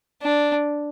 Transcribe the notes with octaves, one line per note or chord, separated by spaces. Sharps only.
D4